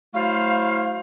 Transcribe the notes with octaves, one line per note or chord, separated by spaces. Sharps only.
F#3 A3 E4 C5 F5